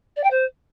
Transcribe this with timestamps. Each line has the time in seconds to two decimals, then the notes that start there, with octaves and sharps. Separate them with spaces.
0.16 D5
0.24 G5
0.31 C5